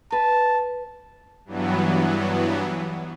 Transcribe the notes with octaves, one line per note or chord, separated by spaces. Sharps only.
B4 A5
G2 E3 F#3 B3